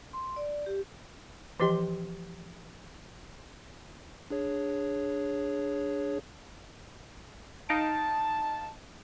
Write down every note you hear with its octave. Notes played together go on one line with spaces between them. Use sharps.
C6
D5
G4
E3 F3 G4 D#5 C6
D4 G#4 C#5
D#4 F5 A5 D7